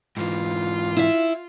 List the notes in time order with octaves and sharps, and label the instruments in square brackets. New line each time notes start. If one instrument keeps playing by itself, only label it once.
[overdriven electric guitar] G#2 E3 [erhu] F4
[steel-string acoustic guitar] E4 E5